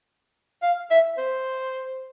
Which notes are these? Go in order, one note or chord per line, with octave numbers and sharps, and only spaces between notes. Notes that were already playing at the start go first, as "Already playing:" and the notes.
F5
E5
C5